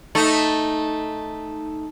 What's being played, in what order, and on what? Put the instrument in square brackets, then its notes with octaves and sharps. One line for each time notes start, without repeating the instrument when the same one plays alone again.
[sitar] A3 D#4